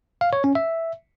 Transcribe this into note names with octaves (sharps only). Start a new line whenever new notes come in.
F5
C#5
C#4
E5